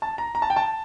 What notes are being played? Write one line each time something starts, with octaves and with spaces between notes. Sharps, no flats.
A5
A#5
A#5
A5
G5
A5